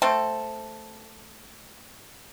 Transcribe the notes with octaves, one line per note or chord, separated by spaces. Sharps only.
A3 C4 A4